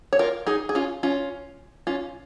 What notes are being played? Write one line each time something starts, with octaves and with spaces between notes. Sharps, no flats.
C#5
F4 A#4
D#4 G#4
G#4
C#4 F4
C#4 F4
C#4 F4